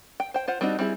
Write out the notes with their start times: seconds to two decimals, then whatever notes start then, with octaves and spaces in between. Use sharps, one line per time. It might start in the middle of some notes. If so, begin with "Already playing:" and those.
0.20 G5
0.34 C5 G5
0.48 F4 C5 F#5
0.61 G3 C4 D4 D#4 F#4
0.79 G3 C4 E4 G#4